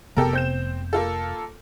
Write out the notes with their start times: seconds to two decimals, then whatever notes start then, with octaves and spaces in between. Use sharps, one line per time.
0.17 F1 C3 B3 G4 A4 A#4
0.33 C4 G6 E7
0.93 A#3 F4 A4